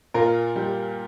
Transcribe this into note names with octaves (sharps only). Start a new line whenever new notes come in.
A#2 F4 A#4
G3